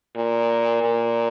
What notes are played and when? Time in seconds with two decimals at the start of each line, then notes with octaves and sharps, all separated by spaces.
0.16 A#2
0.82 A#2